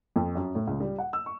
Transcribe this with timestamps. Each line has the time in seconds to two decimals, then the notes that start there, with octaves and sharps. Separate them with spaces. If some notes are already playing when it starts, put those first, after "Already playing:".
0.16 F2
0.35 F#2
0.55 A2
0.67 C#2
0.81 G3
0.98 F#5
1.13 E6
1.26 C#6